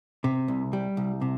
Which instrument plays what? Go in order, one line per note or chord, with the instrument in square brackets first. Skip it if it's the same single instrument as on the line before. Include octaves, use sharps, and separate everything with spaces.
[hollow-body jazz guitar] C3
C2
G3
C2
C3